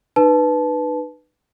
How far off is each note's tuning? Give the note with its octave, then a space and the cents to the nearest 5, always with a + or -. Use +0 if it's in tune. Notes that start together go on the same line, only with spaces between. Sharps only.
D#4 -40 B4 +0 A5 -20